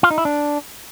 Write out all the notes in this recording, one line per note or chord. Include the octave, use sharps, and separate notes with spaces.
F4
D#4
E4
D4